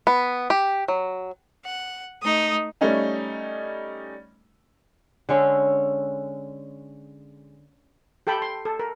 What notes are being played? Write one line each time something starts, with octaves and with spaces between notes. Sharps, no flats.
B3
G4
F#3
F#5
A3 D#4 D#6
G3 A3 C#4 D#4
D3 G#3 C#4 A4
G4 A4 G5 A5 B5
C6
A4
A#4